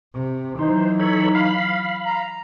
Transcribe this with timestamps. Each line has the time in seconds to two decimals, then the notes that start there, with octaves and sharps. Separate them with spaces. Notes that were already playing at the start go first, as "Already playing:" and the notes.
0.14 C3
0.59 E3 F#3 D#4 C5
1.00 A4 C#5 B5
1.35 F5 B5
2.05 A#5